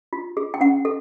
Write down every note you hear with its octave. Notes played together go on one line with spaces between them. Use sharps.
F4
G#4
G5
C#4 F#5
A4